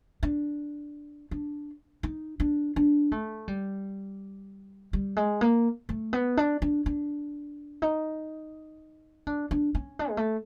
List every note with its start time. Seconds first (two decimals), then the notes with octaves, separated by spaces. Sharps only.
0.23 D4
1.31 D4
2.03 D#4
2.40 D4
2.76 D4
3.12 A3
3.48 G3
4.93 G3
5.16 G#3
5.41 A#3
5.89 A3
6.13 B3
6.37 D4
6.62 D4
6.86 D4
7.82 D#4
9.27 D4
9.51 D4
9.75 C#4
9.99 D4
10.10 G#3
10.17 A3